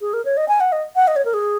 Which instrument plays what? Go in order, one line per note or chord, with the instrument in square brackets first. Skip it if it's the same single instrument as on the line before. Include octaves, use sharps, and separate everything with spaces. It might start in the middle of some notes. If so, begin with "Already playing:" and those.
[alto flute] G#4
A#4
C#5
D#5
G#5
F#5
D#5
F#5
D#5
C#5
A#4
G#4